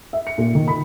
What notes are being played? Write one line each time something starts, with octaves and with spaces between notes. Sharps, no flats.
E5
C#7
A#2
D#3
B5